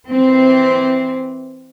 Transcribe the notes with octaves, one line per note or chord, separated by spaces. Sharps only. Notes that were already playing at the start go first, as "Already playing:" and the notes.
E3 C4